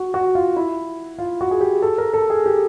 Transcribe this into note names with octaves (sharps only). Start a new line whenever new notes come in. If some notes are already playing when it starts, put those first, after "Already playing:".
Already playing: F#4
F#4
F4
E4
F4
F#4
G#4
G4
A4
A#4
A4
G#4
G4